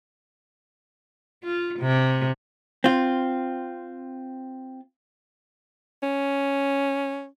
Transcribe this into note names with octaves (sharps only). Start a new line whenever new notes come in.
F4
C3
C4 F4
C#4